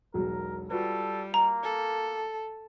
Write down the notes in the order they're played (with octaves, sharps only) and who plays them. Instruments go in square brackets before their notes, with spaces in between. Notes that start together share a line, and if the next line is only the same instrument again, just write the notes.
[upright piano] E1 B1 F#3 [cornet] A#4
[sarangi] G3 [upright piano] F4 F#4 B4 [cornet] A4
[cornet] A#3 [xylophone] A#5
[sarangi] A4